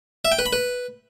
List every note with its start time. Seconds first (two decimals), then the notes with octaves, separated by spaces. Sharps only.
0.25 E5
0.32 G5
0.39 B4
0.46 B5
0.53 B4